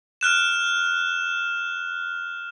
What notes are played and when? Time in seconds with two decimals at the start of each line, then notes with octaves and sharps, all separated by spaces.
0.21 F6 F#6 E7